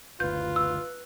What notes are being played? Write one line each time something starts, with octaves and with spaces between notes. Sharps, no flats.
F#1 D2 F4 B4 G6
E6